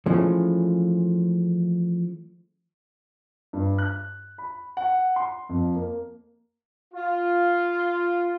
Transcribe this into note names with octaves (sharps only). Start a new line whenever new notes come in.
E3 F3 G#3 A3 C#4
G2
F#6
B5
F#5
C6
F2
A#3
F4